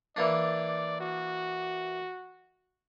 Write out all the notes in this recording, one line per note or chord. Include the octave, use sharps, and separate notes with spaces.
E3 A#3 D4 D5
F#4